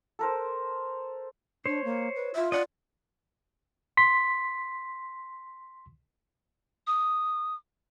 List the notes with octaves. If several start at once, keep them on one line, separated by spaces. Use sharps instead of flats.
A4 A#4 C5
D4 C5 C#5
A#3
B4
F4 E5
D5 D#5 F#5
C6 B6
D#6